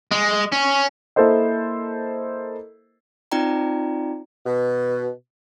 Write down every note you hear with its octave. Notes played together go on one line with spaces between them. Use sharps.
G#3
C#4
A#3 E4 A4 A#4 C5 D#5
C4 D#4 F4 D5 G5 A#5
B2